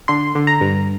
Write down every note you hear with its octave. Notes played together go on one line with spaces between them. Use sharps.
D3 C6
D3
A#5
G2